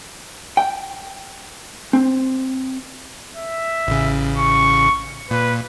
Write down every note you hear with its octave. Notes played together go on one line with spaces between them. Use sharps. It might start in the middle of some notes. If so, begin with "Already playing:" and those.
G5
C4
E5
A1 C#3
C#6
A#2 B4